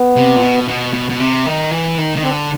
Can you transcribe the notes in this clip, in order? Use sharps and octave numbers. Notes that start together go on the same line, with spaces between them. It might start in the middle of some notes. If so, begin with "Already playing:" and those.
Already playing: B3
C3
A#2
B2
B2
B2
B2
C3
D#3
E3
D#3
D#3
D3 C4